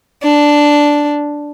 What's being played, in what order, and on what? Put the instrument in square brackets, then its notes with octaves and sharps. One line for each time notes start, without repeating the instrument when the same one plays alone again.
[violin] D4